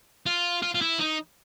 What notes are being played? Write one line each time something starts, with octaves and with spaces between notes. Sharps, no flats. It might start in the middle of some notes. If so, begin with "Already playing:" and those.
F4
F4
F4
E4
D#4